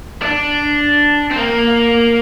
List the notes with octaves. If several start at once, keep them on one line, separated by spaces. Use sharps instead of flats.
D4
C4
A#3